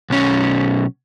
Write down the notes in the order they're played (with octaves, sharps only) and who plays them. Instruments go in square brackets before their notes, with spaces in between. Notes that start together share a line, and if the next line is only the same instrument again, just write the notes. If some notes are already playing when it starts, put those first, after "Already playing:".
[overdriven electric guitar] B1 C#4